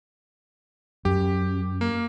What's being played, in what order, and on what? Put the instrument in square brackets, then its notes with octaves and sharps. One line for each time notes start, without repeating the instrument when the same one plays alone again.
[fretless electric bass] F#2 [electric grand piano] G4
[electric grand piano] A#3